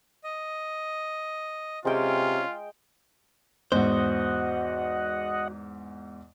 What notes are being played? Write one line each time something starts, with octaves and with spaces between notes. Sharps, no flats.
D#5
C3 G#3 C#4 F4 G5
E2 G#2 F#4 C5 D#5 F#5